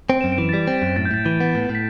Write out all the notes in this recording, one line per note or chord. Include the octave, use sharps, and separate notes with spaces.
C4 D7
F#2 E7
D7
E3
A6
G3 B6
C4
F#2
A2 A6
G6
A2 A6
E3
B3
A2
A2
B6